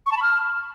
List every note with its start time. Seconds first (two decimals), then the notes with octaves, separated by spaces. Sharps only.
0.06 C#6
0.12 A5
0.17 B5
0.22 F6